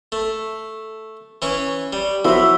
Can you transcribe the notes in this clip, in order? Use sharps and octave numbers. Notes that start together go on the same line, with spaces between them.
A3
E3 C#4 C#6
G3
F3 F#3 E4 F#4 B4